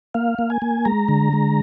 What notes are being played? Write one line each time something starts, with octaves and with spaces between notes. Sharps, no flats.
A#3 F5
A#3
G#5
A#3
G#3 A#5
D3
G#3